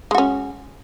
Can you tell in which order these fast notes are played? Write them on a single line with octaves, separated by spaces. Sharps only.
G#3 F#4 C#4